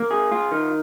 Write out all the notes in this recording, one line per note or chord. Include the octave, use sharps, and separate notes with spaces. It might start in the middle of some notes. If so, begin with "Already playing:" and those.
Already playing: A#3
G#4
F4
D#3